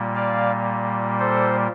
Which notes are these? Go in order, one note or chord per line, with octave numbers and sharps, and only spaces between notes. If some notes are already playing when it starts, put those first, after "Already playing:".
Already playing: A#2 G3 A#3
D5 F5
A4 C5